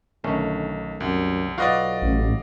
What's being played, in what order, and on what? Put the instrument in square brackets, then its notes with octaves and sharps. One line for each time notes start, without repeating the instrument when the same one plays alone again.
[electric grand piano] B1 [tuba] D3 [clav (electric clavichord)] D#3 A3 C#4
[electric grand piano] C2 [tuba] F#2
[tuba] B1 [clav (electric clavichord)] F4 F#4 B4 [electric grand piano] D5 D#5 F5
[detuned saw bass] A1